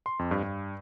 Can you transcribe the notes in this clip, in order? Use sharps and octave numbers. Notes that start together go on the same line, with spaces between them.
C6
F2
G2
G2